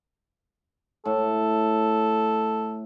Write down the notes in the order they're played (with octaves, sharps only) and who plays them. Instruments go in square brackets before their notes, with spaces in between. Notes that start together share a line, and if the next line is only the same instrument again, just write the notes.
[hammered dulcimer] A2 [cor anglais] A4